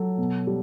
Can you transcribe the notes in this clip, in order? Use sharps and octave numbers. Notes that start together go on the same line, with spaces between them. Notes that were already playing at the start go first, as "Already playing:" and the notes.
Already playing: F#3 A4
B2
G3